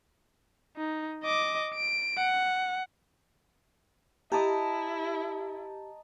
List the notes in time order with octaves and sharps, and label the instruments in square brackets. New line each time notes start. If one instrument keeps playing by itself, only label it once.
[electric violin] D#4
D#5 D6
D7
F#5
[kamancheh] E4 [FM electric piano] G4 [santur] D#5 A5 A#5